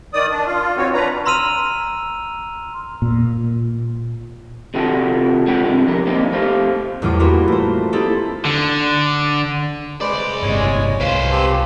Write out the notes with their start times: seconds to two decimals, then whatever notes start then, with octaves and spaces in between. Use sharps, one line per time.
0.13 D#3 D5 D#6
0.31 D4
0.46 F4
0.77 D#3 C4 F#4 C#5
0.94 D4 B4 A#5
1.25 A#5 C6 E6 F6 D#7 F7
3.02 A#2
4.74 C3 D#3 F4 F#4 A4 G5
5.47 G#3 C4 G#4 A4 F#5 G5
5.64 G2 C3 D#3
5.87 F2 G4 A#4
6.07 A#3 C4 D#4 G4
6.32 A3 G4 C5 F5
7.02 E2 A2 G3 F4 D6
7.19 A#3 C4 F4 F#4 A#4 B4
7.48 A3 C5
7.93 A#3 C4 D#4 E4 G4 A4
8.45 D3
10.01 C2 G#3 B4 C5 D5
10.43 G1 A2 C3 G#3 C#5 G#5
11.01 C2 F4 B4 C5
11.31 C4 G4 A5